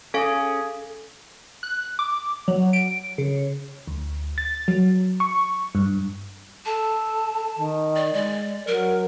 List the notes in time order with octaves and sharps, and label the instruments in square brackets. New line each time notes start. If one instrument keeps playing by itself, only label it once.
[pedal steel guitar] C#4 G#4 [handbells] A4 F5
[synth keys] F#6
D6
F#3
D7
C#3
[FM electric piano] D2
A6
F#3
C#6
G2
[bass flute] A4 [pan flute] A5
[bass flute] D#3
[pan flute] D5
[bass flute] G#3 [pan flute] D5
[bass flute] F#3 [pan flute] A#4